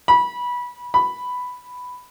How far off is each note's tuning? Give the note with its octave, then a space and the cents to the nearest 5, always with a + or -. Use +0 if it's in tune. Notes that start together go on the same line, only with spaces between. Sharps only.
B5 -20
B5 +5